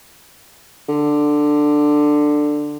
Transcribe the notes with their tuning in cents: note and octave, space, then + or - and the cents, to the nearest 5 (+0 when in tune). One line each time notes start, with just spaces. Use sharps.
D3 +10